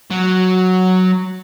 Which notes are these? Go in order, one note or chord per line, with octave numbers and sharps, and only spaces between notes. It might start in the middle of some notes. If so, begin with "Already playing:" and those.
F#3